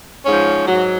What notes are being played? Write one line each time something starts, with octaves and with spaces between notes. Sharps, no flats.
G#2 C#4
F3
G#2 F#3